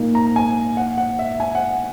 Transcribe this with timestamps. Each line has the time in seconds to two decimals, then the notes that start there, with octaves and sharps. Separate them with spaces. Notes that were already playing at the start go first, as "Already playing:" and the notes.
Already playing: A#2 A#3 D#4
0.15 A#5
0.36 G#5
0.77 F#5
0.98 F#5
1.19 E5
1.40 G#5
1.55 F#5